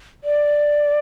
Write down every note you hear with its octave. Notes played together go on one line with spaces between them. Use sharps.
D5